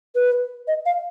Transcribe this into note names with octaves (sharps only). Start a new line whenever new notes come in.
B4
D#5
F5